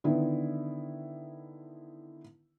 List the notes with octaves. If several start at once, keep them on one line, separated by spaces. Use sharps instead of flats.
D3 D#3 B3 E4